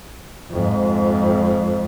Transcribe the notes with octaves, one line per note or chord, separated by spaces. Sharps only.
F2 G#2